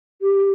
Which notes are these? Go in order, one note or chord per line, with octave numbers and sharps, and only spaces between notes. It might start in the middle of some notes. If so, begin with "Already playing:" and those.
G4